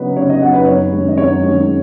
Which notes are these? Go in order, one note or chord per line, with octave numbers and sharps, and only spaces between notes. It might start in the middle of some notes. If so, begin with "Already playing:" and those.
Already playing: C#3 F#3 B3 D#4 B4
C#3 C#5
D#5
F#3 B3 D#4 F#5
B4
F#2 C#5
D#3 G#3 C#4
D#5
F#2 C#5
D#3 G#3 C#4